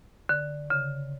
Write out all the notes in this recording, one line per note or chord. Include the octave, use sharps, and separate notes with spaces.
D3
C#3